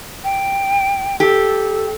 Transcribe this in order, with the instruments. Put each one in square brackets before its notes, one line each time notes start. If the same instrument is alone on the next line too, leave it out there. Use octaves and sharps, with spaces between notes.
[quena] G5
[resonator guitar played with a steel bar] G4 [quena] A4